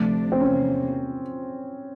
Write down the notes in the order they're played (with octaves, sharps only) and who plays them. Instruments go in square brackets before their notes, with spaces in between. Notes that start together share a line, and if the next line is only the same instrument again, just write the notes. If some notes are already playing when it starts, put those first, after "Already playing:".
Already playing: [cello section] D2 C3 F3 A3 D4
[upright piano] C4
[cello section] E2 C3 F3 A#3 [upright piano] C#4